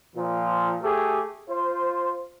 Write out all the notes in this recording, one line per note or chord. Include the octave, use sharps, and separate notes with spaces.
A#2 F3
A3 G4 G#4
F4 C5